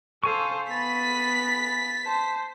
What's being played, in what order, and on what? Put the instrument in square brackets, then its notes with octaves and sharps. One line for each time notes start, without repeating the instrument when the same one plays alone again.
[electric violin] A4 C5 [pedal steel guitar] F5 G#5 C#6
[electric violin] B3 B5 [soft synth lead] A6 [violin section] B6
[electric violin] C5 [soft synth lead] A5